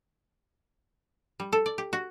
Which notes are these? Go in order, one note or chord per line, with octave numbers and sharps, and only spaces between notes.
G3
A4
D5
G4
F#4